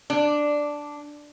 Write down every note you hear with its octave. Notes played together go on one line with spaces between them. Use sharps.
D4